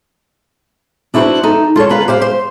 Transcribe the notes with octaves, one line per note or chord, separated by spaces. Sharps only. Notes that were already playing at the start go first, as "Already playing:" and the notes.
D4 E4 F#4 A4 B4 C5
D#4 A4
F4 A4 B4 C#5
A#3 F4 B4 F5 F#5
G4 C5 F5
C5